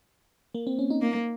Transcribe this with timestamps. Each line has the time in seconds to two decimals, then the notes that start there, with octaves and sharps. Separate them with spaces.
0.55 A#3
0.67 C4
0.79 C#4
0.90 D#4
1.02 A#3